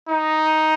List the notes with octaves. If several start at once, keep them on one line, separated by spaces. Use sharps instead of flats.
D#4